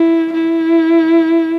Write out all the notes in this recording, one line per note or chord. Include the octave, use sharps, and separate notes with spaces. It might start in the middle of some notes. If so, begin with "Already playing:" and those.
Already playing: E4
E4